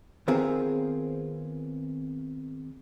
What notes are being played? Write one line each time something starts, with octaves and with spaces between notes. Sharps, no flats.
D#3 B3 C4 F4 G#4 A#4